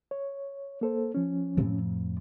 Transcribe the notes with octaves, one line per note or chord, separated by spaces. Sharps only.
C#5
A#3 A4 C5
F3 C#4
F2 A2